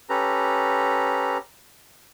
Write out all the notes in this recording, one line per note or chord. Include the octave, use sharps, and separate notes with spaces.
C#4 G4 A4 B4 A#5